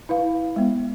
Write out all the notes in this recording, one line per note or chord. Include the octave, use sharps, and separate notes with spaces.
E4 B4 F5
G#3 B3